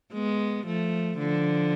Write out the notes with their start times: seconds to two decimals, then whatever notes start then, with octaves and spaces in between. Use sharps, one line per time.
0.13 G#3 B3
0.67 F3 A3
1.19 D3 F3